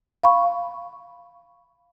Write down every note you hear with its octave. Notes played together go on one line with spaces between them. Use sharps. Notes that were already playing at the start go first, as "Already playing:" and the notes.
F5 B5 C#6